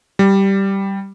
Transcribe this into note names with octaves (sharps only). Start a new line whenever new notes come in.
G3